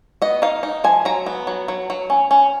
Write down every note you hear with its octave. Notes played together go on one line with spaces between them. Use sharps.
B3 D#5
D#4 F5
D#4
F3 G#5
F#3 A#5
B3
F#3
F#3
F#3
C#4
C#4